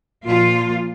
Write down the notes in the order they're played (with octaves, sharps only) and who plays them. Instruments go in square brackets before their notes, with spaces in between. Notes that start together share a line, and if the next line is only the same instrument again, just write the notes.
[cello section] A#2 F3 F4